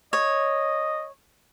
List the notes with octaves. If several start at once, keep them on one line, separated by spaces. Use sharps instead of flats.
C#5 D#5